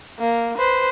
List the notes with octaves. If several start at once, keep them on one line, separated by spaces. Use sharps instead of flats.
A#3
B4 C5